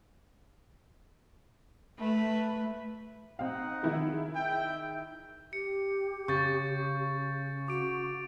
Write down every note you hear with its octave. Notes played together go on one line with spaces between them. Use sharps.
A3 B4
C4 D#4 D#5 F5 F#5
D#3 E4 G#4
E5 G5
G4 C#7
C#3 C#6 G6 A6
F#4 D6 D7